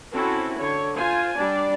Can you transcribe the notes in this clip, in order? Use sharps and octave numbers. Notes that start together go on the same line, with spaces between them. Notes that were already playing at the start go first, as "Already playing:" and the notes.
C4 C#4 E4 F#4 A4
D3 C#5
F4 C5 G#5
G3 D4 D5